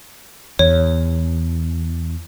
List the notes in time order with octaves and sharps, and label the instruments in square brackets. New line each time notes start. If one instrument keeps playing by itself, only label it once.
[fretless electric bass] E2 [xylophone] C#5